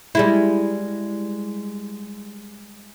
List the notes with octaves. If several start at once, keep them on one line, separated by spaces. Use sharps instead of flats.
G3 G#3 E4